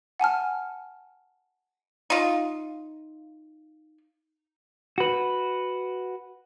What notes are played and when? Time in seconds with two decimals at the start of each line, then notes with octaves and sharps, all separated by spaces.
0.20 F#5 G#5 A5 F6
2.10 D#4 F4
4.98 F#4 B4